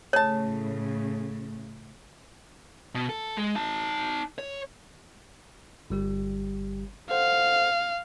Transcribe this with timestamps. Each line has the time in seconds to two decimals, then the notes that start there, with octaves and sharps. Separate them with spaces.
0.13 A2 C#3 G#4 C#5 A5
2.95 B2
3.09 A4
3.37 G#3
3.56 D#4 A5
4.38 C#5
5.90 G1 G3 G4
7.11 A4 C5 F5 F#5